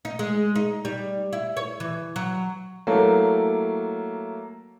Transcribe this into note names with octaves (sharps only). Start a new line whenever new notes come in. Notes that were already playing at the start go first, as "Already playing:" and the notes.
D#4
G#3
D#4
G3
E4
C#5
E3
F#3
F#3 A3 A#3 E4 A4 C#5